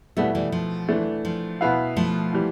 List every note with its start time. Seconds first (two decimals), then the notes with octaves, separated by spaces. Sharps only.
0.17 B2 G3 A3 B3 E4
0.35 E3 G3
0.52 F3
0.89 E3 A3 D4
1.25 F3
1.61 B2 B3 E4 B4 F5
1.96 F3 A3
2.33 E3 G3